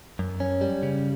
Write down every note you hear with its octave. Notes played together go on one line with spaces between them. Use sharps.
F#2
C#4
G3
C#3